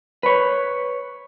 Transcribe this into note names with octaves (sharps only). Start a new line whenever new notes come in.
B4 C#5